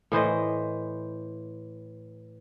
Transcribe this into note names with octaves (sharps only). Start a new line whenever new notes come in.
A2 E3 C5 D#5